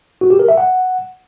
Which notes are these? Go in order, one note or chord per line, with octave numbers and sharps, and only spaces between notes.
F#4
G4
A#4
E5
F#5